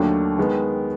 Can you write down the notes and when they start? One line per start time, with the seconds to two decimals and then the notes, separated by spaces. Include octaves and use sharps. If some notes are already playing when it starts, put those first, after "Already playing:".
Already playing: D#2 D3 F#3 A3 D4
0.38 D#3 G#3 B3